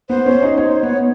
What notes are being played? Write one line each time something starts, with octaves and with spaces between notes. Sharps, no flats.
B3 C5
C#4
D#4
D#4 C#5
C5
B3 C#5